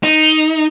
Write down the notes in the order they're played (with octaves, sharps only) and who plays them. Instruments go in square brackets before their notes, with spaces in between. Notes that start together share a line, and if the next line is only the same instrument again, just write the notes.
[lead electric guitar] D#4